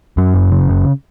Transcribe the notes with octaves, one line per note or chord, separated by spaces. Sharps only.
F#2 F#3
F#1
C#3
F#1